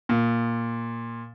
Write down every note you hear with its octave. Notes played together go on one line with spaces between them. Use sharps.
A#2